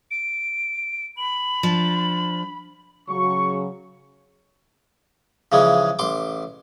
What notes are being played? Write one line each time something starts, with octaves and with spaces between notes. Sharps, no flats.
D7
B5 F#7
F3 D4
C#3 F#3 C#6
C#3 E3 F3 G#3
A1 C6 D6